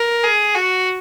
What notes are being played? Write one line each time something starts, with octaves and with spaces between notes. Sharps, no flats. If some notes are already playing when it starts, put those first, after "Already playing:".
Already playing: A#4
G#4
F#4